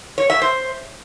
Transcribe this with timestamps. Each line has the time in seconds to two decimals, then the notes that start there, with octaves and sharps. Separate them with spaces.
0.18 C#5
0.30 E5
0.42 C5